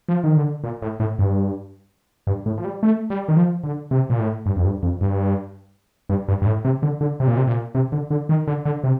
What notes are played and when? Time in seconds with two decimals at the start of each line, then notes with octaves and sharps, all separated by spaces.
0.09 F3
0.24 D#3
0.37 D3
0.64 A#2
0.82 A2
1.00 A2
1.19 G2
2.27 G2
2.46 A2
2.58 F3
2.64 G3
2.83 A3
3.10 G3
3.28 D#3
3.37 F3
3.63 D3
3.91 C3
4.10 A#2
4.19 A2
4.46 G2
4.56 F2
4.65 G2
4.83 F2
5.01 G2
6.09 G2
6.28 G2
6.42 G2
6.46 A2
6.65 C3
6.83 D3
7.01 D3
7.20 C3
7.27 A#2
7.37 C3
7.47 A#2
7.75 C3
7.92 D3
8.11 D3
8.29 D#3
8.47 D3
8.65 D3
8.84 C3